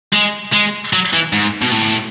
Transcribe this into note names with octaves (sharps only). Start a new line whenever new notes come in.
G#3
G#3
F#3
E3
G#2
B2
A2